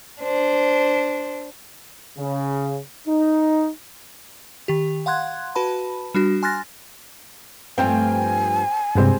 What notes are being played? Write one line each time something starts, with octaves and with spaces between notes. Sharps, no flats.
D4 C5
C#3
D#4
D#3 G4
F5 F#5 C6 F#6 G#6
F#4 B4 A5 B5
G3 D4 F#4
G#5 C6 F6 F#6 A6 A#6
G2 F3 A3 C4 G5 G#5
G2 C3 G3 G#3 C4